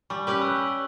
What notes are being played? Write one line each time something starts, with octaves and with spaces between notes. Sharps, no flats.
G3 G#5 C#6
C#4 G4 B4 C#6 F#7
E6 F#6